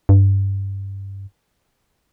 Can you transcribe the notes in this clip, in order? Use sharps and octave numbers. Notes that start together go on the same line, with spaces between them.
G2